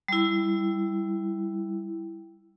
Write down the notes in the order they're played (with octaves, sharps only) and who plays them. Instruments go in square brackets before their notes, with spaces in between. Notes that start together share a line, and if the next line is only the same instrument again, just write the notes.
[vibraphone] G3 E4